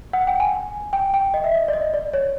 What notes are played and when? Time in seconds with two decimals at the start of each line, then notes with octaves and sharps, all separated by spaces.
0.13 F#5
0.27 G5
0.40 G#5
0.93 G5
1.14 G5
1.34 D#5
1.44 E5
1.55 D#5
1.68 D5
1.73 D#5
1.94 D5
2.14 C#5